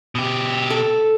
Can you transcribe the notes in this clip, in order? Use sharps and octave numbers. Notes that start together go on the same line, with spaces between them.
B2 G4
A4